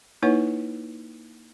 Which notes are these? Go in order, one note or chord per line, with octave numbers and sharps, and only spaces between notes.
A#3 D#4 E4 B4 C#5 F#5